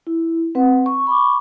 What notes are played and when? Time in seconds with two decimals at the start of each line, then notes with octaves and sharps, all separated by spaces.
0.07 E4
0.55 C4 B4 F#5
0.86 C#6
1.07 B5 C#6 D6